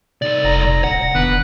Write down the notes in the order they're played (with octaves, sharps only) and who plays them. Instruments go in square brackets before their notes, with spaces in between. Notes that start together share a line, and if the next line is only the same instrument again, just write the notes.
[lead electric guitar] C2 D5 [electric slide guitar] C3 D#4 A4
[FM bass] F1 [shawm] A#5
[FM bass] D1 [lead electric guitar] F#5
[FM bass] E1 [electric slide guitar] D#3 B3 D4 [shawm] B4